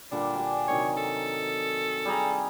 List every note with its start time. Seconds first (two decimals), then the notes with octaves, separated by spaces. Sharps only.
0.11 A#2 D3 G3 D4
0.35 G4 G#5
0.68 C3 D#3 F#3 C#5
0.97 A4
2.05 G3 G#4 A#5